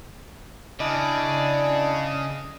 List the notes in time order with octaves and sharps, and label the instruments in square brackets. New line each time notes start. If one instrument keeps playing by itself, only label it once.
[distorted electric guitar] C#3 [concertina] D4 E4 [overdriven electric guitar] D5 [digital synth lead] D#5